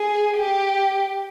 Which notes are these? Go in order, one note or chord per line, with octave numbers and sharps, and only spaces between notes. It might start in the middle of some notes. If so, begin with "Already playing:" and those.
Already playing: G#4
G4